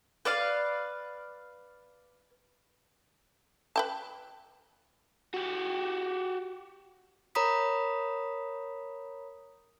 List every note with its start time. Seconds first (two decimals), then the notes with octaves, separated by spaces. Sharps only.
0.25 B4 D5 F5
3.76 B4 G5 A5
5.34 F#4 G4
7.35 A#4 C#5 A#5 B5 D#6 B6